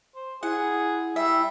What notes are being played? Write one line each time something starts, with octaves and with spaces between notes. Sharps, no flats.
C5
E4 G#4 F#5
G3 E5